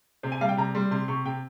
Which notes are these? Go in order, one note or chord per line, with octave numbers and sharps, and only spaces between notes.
C3 C5
G#5
G3 F5
G5
C3 A#5
G3 C6
C3 C6
C3 C#6
C3 G5